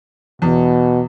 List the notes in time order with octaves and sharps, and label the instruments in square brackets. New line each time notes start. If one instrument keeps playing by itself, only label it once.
[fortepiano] E2 [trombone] B2